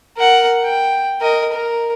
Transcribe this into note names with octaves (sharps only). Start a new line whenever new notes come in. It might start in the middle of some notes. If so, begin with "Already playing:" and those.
A#4 F#5
G5
A#4 D#5
A#4